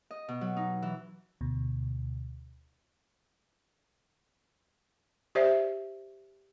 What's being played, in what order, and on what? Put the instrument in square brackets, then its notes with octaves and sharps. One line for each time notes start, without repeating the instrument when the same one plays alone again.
[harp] D#5
B2
F#3
D#4
E3
[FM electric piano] D2 B2
[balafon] G4 C5 D5 E5